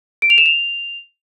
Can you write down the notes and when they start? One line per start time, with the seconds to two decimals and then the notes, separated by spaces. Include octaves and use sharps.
0.22 D7
0.30 F7
0.38 E7
0.46 F7